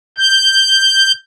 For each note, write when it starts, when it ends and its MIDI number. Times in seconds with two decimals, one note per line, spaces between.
0.18 1.12 91